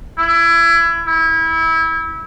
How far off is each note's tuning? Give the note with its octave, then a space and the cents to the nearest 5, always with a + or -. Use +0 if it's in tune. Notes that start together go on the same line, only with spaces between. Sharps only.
E4 +25
E4 -20